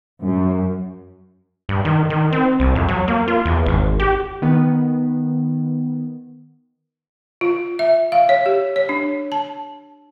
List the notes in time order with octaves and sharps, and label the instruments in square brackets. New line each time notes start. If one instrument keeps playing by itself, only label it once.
[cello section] F#2
[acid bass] G2
D#3
D#3
C4
C2
F2
F#3
A#3
F4
E2
G#1
G4
[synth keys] D#3 B3
[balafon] F4
E5
F5
C#5
G4
C#5
D4
A5